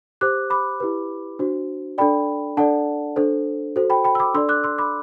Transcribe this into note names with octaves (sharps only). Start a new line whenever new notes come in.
G4 C5 D6 F#6
B5 D6
E4 G4 B4
D4 F#4 C5
D4 A4 D5 G5 B5
D4 A4 D5 F#5 A5
D4 A4 C5
F#4 A4 C5
G5 B5
G5 B5
E6
B5 D6
D4 A4 D5 C6 E6
D6 F#6
C6 E6
B5 D6